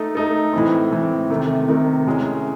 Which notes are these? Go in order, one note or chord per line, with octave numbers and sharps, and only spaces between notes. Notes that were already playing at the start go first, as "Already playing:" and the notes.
Already playing: A3 D#4 A4
A3 D#4 A4
A2 E3 C4
A2 E3 C4
C3 D#3 A3
C3 D#3 A3
A2 G#3 C#4